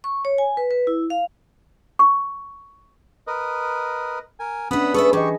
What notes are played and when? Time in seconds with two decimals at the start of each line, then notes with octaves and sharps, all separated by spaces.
0.04 C#6
0.25 C#5
0.38 G#5
0.57 B4
0.71 B4
0.87 E4
1.10 F5
1.99 C#6
3.27 A#4 B4 D#5
4.40 A#4 G#5
4.71 B3 C#4 D4 E5 F#5 B5 D#6
4.94 B3 G#4 A4 B4 E5 C#6 D#6
5.13 E3 G4 G#4 D#5 C#6